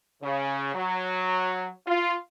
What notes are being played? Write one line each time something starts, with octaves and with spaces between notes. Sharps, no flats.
C#3
F#3
F4